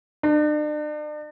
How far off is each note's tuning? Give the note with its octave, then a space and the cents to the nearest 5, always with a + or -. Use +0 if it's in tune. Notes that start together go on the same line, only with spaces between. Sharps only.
D4 +40